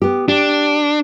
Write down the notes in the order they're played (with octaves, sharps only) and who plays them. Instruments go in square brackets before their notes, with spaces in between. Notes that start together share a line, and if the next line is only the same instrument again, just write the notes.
[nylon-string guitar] B3 G4
[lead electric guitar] D4 [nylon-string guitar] G4